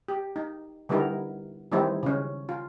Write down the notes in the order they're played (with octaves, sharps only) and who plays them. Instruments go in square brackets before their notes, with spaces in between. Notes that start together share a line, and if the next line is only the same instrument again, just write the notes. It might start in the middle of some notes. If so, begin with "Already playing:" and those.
[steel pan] G4
D#4
D3 G3 B3 D#4 E4 A#4
D#3 E3 G3 C4 D#4 E4
C#3 C#4
F4